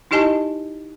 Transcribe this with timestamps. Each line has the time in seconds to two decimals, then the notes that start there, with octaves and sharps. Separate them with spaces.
0.11 D#4 E4 G4 D#5 G#5 A5